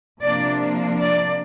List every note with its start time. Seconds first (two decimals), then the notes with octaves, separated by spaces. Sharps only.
0.22 C3 F3 A#3 D4 D5
1.01 D5